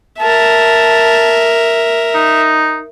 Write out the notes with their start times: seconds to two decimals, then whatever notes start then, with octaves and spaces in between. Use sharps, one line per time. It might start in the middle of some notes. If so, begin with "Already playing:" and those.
0.20 A#4 E5 A5
2.15 D#4